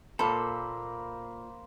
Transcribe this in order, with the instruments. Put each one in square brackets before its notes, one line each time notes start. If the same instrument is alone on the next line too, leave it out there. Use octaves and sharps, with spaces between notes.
[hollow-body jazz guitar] A#2 A4 [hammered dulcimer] A#3 C5 [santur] B5